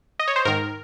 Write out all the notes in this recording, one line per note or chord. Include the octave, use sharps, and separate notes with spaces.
D#5
C#5
C5
G#2 D#3 A#4